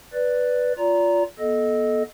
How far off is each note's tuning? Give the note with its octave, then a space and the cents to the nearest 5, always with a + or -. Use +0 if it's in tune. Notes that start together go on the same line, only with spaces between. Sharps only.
B4 +0 D5 +0
F4 +0 D5 -35 A#5 +0
B3 -30 A4 -20 D#5 +0